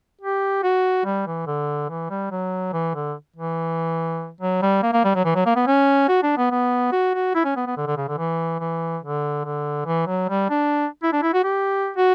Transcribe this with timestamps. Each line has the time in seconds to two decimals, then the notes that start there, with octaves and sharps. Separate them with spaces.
0.21 G4
0.63 F#4
1.05 G3
1.27 E3
1.47 D3
1.89 E3
2.10 G3
2.31 F#3
2.73 E3
2.95 D3
3.36 E3
4.41 F#3
4.62 G3
4.82 A#3
4.93 A#3
5.04 G3
5.15 F#3
5.25 E3
5.35 F#3
5.46 A#3
5.56 B3
5.67 C#4
6.08 F#4
6.23 D4
6.37 B3
6.51 B3
6.92 F#4
7.14 F#4
7.35 E4
7.44 C#4
7.56 B3
7.67 B3
7.77 D3
7.87 D3
7.97 C#3
8.08 D3
8.18 E3
8.60 E3
9.02 D3
9.45 D3
9.86 E3
10.07 F#3
10.29 G3
10.50 D4
11.03 E4
11.12 D4
11.22 E4
11.34 F#4
11.44 G4
11.96 F#4